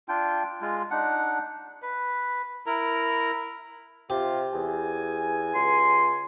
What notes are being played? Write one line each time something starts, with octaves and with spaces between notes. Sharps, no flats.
D4 F4 G5
G#3 F4
D4 D#4 F#5
B4
E4 A#4 A#5
C3 F4 G4
E2 G#5
C#2 C6